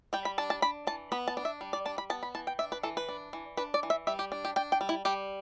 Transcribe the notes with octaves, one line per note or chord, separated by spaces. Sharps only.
G3 G5
B5
D4 A5
A5
D4 B5
E3 A5
B3 B5
A5
D4
E5
G3
D5
D4 A5
B5
B3 A5
B5
E3 A5
G5
D4 E5
B4
E3 A4
B4
D4
E3
D4 B4
D5
E3
E5
G3 E5
G4
D4
G4
D4 G5
G5
G3
E4
G3 G4